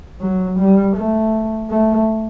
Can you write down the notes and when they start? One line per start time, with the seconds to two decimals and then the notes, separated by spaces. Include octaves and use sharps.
0.21 F#3
0.59 G3
0.96 A3
1.70 A3